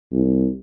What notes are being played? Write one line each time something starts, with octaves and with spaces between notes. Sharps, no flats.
C2